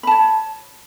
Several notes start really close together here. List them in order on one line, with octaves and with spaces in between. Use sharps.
B5 A5 C#5